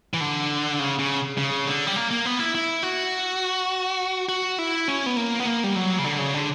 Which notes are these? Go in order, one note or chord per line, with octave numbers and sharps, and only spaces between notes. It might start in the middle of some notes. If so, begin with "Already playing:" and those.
E3
D3
C#3
C#3
C#3
D3
G3
A#3
A#3
B3
E4
E4
F#4
F#4
E4
C#4
B3
A#3
B3
A#3
G3
F#3
C#3
D3
C#3
D3